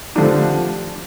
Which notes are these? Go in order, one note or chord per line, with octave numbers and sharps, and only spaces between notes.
D3 F3 A3 D4 G4